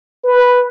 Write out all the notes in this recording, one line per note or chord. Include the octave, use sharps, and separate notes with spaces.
B4